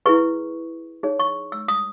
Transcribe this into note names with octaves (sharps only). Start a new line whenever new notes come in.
E4 G#4 B4 C#6
D#4 G#4 C#5
C#6
E6
D#6